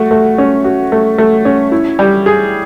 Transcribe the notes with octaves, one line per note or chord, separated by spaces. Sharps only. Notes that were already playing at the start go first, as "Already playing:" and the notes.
Already playing: A3 F#4
A3
C#4
F#4
A3
A3
C#4
E4
G3
G#4